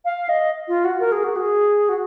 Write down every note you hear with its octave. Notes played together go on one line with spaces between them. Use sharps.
F5
D#5
F4
F#4
A#4
G#4
F#4
G#4
F#4